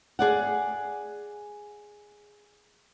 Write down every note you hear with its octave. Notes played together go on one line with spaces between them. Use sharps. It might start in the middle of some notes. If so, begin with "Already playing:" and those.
G#4 D5 F#5